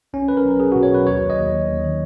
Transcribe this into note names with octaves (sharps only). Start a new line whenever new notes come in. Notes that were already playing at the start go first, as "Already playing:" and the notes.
B1 C#4
B1 B4
A#4
B1
B1 G#4
B2 F#4
C#5
F#3 B4
D#2 C#5
D#2
D#5
D#2
D#2
D#2
D#3